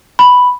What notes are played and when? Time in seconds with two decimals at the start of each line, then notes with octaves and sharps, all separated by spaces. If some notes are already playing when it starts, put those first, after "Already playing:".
0.19 B5